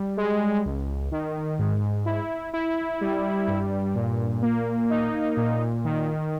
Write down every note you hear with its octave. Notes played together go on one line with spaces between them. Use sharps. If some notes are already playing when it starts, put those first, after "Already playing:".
Already playing: G3
G#3
C#2
D#3
G#2
E4
E4
G3
G2
A#2
A#3
D#4
A#2
D#3